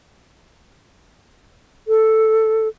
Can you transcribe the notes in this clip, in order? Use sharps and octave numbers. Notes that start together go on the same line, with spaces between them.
A4